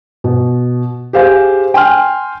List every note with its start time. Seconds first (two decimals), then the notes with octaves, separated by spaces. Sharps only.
0.24 B2
1.13 G4 G#4 C5 F5 G#5
1.74 G5 G#5 C6 F6